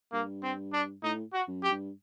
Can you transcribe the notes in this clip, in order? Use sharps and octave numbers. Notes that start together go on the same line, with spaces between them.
G2 A#3
C4
D4
A2 D#4
F#4
F#2
G4
G2